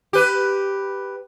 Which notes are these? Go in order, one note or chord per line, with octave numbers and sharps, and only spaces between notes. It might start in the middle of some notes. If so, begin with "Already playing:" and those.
G4 B4